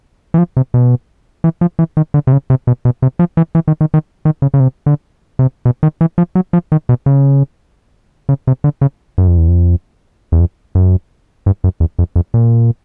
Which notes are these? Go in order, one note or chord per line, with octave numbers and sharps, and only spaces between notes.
E3
F3
C3
B2
E3
F3
E3
D#3
D3
C3
C#3
C3
B2
B2
C3
F3
E3
E3
D#3
D#3
D#3
D#3
C#3
C#3
C3
D3
C3
B2
D#3
E3
F3
F#3
F3
D#3
B2
C#3
C#3
C3
D3
C#3
F#2
F2
E2
F2
E2
F2
F#2
G2
F#2
E2
F2
F2
A#2